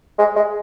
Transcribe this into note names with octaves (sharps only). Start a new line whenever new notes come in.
G#3
G#3